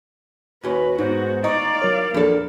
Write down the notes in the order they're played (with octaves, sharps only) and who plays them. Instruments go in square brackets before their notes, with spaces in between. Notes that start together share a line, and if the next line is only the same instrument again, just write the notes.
[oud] D#2 C#4 [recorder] F#4 [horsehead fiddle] B4
[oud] G#2 [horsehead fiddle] B3 F#4 [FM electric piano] D#4 [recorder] C5
[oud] D#4 [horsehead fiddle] D5 F5 [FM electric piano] D#5 A#5 C#6
[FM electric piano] F#3 C#5 [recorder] A#4
[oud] E2 A4 [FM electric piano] F3 D4 [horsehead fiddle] A#3